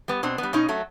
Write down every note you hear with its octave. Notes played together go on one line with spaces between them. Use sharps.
G3 B3
B2 C4 D4
B3
G3
B2 C#4 D#4
F#3 A3